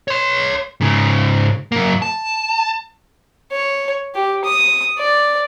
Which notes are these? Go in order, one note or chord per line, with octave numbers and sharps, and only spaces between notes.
C#5 C6
G#2 C#3
F#2 A#3
A5
C#5
G4
D#6
D5